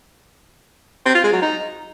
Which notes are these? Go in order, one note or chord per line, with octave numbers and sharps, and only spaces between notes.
C4
F4
G#3
F#3
D#4